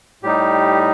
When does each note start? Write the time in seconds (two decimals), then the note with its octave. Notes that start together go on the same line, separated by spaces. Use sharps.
0.23 A2 G3 D#4 G4